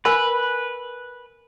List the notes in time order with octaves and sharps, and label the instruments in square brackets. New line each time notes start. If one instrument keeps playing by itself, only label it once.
[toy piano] A#4 G#5 B5 [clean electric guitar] B4